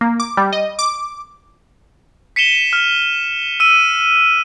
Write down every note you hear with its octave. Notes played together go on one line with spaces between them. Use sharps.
A#3
D6
G3
D#5
D6
B6 C#7 D#7 E7 G7
F6
E6 D#7